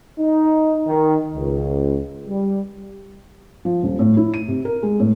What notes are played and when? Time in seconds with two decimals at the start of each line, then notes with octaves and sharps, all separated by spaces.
0.19 D#4
0.87 D#3
1.36 C#2
2.29 G3
3.65 F3
3.83 D#1
3.99 A2
4.17 E4
4.34 D#7
4.48 C3
4.65 A#4
4.83 G#3
5.00 A2